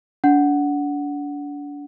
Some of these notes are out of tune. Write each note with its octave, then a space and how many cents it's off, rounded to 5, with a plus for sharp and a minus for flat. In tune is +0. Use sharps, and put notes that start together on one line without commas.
D4 -30 F#5 +0